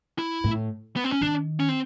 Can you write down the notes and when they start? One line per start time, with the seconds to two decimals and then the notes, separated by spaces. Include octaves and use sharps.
0.19 E4
0.44 A2
0.96 B3
1.04 C4
1.12 C#4
1.21 D#3 D4
1.60 C#4
1.69 C4